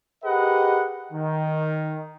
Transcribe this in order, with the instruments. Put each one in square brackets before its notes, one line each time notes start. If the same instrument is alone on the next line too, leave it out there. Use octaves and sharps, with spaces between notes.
[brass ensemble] G4 G#4 A#4 B4 D#5 F#5
D#3